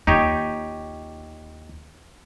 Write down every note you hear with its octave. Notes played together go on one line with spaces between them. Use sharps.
D#2 D#4 F4 G4 C#5